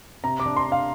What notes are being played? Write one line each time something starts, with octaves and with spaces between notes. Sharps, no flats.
C3 A#5
D6
D4
C6
D4
F5